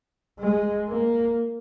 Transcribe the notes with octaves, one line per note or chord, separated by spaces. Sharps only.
G#3
A#3